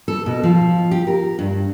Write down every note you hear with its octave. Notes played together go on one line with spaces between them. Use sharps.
A4
B2
F3
G4
A#4
G2